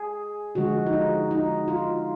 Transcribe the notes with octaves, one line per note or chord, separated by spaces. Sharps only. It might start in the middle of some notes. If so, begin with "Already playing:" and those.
Already playing: G#4
D3 F3 G#3 F#4
D#4
F4
D#4
F4